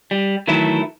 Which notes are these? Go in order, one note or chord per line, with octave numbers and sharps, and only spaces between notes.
G3
D#3 E3 F#3 A3 E4